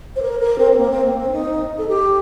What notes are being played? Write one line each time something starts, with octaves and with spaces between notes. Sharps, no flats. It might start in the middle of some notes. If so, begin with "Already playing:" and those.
C5
A#4
A#4
C4
C4
A#3
C4
A#3
C4
D4
D#4
A4
G4